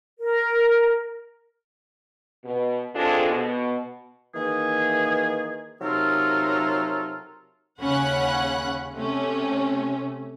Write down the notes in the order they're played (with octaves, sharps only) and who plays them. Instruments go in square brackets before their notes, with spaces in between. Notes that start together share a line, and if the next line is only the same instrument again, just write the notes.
[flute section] A#4
[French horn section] B2
G#3 C4 D4 F4 G#4 A4
B2
[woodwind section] D#3 E3 A#3 G#4
C3 F#3 D#4 F4 A4 A#4
[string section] D#2 C#3 C#4 F#5 B5 F#6
C3 A3 C#4